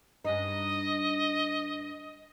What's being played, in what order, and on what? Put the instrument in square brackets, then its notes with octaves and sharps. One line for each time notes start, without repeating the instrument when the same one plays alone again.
[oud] G2 C#4 D#4 [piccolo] D#5